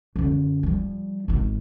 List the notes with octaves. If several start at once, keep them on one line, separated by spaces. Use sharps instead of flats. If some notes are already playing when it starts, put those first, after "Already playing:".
F#2 D3
F3 G3
G#1 D#3